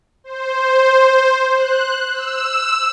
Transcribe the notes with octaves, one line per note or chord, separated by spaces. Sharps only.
C5
F#6
E6